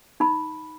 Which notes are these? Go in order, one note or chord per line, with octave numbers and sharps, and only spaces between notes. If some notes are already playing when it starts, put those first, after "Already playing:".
D#4 B5